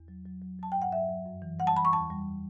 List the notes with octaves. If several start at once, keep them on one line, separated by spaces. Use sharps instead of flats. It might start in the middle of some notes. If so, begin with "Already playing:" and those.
Already playing: E2
F#3
F#3
F#3
F#3 A5
G2 G5
F#5
F#3 E5
F#3
F#2
E3
G3 F#5
A5
E3 B5
C#6
E2 A5
G3